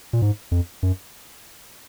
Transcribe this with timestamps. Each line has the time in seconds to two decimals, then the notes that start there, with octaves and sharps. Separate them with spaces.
0.13 A#2
0.22 G#2
0.51 F2
0.83 F#2